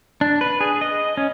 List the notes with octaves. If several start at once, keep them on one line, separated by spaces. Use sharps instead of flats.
D4
B4
G#4
D#5
C#4